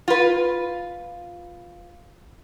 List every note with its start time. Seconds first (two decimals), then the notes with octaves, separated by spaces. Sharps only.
0.08 F4 B4